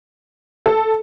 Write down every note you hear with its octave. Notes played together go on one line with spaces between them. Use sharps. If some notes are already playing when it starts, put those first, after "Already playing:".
A4